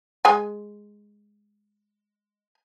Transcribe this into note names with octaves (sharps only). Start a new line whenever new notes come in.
G#3 G#5